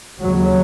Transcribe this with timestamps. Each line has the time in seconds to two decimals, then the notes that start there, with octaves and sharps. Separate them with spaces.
0.22 D#2 C#3 F#3